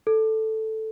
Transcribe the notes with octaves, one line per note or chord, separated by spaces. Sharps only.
A4